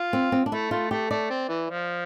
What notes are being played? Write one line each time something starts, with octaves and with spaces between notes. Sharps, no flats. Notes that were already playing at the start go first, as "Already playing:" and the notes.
Already playing: F4
C4
C4
D4
A3 E4
A3 F4
A3 G4
A3 D5
C4
E3
F3